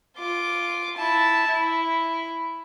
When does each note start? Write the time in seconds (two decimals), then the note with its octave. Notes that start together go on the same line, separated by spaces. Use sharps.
0.18 F4 D6
0.97 E4 A5
1.48 E4